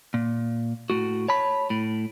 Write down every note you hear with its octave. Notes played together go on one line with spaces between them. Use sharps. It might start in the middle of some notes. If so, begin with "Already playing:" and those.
A#2
A2 F#4
C#5 A5 B5
A2